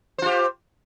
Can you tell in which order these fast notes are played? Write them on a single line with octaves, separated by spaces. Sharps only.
C5 F4 G4